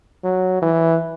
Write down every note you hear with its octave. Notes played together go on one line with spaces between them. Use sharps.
F#3
E3